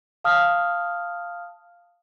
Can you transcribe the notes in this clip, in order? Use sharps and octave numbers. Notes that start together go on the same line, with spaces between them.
F5 A5 D#6 F6